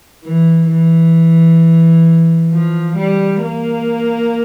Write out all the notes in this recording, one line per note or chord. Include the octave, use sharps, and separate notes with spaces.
E3
E3
F3
G3
A#3